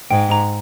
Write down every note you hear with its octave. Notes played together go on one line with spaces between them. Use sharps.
G#2 G5
A#5